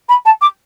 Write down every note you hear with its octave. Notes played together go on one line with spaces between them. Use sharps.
B5
A5
D6